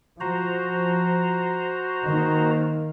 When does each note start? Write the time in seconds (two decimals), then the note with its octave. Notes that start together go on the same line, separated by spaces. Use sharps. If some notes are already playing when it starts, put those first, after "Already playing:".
0.20 F3 F#4 C5 A#5
2.08 D#3 A#3